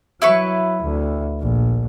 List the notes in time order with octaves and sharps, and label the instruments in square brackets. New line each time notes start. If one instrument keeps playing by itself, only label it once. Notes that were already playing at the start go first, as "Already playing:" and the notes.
[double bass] F#3 [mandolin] E4 B4 C#6
[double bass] D2
A#1